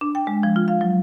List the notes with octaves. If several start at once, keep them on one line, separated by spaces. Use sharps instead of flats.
D4
G5
G#3
F3
F4
F5
F#3